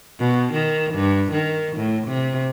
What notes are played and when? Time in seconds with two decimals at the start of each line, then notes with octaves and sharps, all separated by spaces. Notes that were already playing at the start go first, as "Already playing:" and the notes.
0.19 B2
0.53 D#3
0.94 G2
1.32 D#3
1.77 A2
2.07 C3